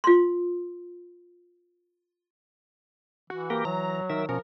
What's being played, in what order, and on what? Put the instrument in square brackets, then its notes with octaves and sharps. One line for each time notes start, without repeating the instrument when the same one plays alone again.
[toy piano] F4 C6
[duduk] E3 [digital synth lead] F#4
[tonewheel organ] A#3 G4 A#4
[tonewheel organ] E3 [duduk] F#3 [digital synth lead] A#5
[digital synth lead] D#3 [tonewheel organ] A#4 E5
[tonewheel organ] B2 C#4 [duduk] F3 [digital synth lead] A#4